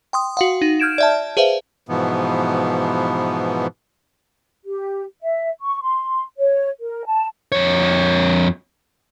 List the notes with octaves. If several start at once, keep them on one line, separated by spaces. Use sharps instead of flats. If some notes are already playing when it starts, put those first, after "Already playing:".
G5 C6 D#6
F#4 F5 F#5
D#4
F6 G6 G#6 D7 E7
D5 E5 A5
G#4 B4 C5 E5 F5
G#2 B2 E3 F3 B3
G4
E5
C#6
C6
C#5
A#4
A5
F2 C#5